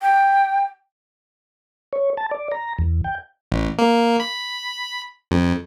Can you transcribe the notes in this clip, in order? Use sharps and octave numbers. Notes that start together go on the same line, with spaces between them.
G5
C#5
A5
D5
A#5
E2
G5
A1
A#3
B5
F2